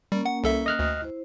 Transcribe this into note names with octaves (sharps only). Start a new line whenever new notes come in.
G3 A#3 C#4 A#4
F#5
C2 A4 E5
D#5 F6 F#6
D2
E4 C5